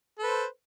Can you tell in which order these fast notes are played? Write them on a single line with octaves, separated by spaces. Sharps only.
A4 B4 C5